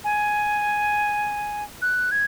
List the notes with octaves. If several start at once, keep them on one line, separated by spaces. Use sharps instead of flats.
G#5
F#6
G#6